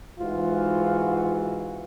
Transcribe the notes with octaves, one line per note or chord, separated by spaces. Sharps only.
G#2 E3 F4 F#4